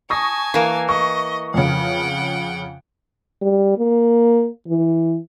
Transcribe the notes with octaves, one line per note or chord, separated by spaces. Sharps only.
G#5 A5 C#6 D#6 A#6
E3 A#3
D#5 C#6
F2 C#3 F#5 G5
G3
A#3
E3